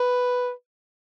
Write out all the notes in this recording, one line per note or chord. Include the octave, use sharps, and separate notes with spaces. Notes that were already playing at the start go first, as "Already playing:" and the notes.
Already playing: B4